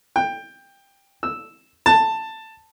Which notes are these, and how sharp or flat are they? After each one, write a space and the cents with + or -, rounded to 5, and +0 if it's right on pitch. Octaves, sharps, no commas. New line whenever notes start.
G5 +15
E6 -5
A5 +10